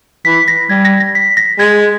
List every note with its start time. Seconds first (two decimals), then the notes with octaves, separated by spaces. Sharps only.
0.25 E3 B6
0.48 A#6
0.69 G3 G#6
0.85 A#6
1.00 A#6
1.15 B6
1.37 A#6
1.59 G#3 G#6